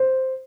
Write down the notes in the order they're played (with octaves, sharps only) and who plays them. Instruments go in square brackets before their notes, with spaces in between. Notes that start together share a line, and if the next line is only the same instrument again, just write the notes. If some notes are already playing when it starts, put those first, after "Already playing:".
Already playing: [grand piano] C5